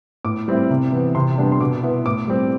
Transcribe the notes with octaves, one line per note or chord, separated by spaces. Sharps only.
A2 D6
G3 C4 E4
C3
E3 B3
C3 C6
G3 B3 D4
C6
B2 D6
B3 E4
A2 D6
G3 C4